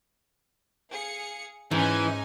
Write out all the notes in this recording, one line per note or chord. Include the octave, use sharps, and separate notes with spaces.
G#4 F5 C#7
G#2 E3 C#4 D#4 G#5